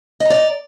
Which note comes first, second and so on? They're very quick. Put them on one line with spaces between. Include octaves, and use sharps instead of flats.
D#5 A#5 D5